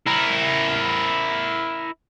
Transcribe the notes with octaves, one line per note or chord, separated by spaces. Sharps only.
E4 A#4